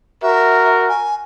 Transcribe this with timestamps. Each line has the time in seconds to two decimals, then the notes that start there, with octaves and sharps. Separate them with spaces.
0.22 F#4 A#4 E5
0.89 G#5